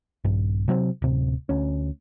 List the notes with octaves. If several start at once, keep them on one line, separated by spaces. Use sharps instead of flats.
A#1 G2
C3 F#3 A3 C4
D1 C3
D2 C#4